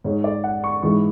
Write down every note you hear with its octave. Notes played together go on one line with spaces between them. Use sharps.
G#2 G#3 C#5
D5
F#5
C#6
G#2 E3 G#3 C#6